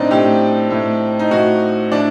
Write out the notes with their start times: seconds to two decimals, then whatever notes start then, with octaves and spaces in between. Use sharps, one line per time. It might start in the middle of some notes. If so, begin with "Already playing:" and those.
Already playing: A2 C4 D4 D#4
0.11 A2 G4
0.70 A2
1.19 D#4
1.31 A2 F#4
1.91 A2 D4